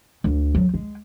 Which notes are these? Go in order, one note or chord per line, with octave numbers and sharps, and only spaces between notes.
D2
F#3
G#3